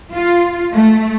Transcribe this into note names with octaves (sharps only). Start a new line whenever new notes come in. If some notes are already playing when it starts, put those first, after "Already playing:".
F4
A3